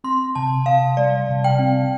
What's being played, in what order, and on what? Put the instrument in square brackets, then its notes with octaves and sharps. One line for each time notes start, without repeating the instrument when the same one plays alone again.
[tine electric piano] C4 [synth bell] C6
[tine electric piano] C3 [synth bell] A5
[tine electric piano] C3 [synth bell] F5
[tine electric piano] G3 [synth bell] D5
[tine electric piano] C3
[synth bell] G5
[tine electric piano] C4